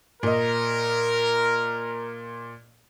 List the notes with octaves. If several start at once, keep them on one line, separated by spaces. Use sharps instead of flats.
A#2 A#4 D#5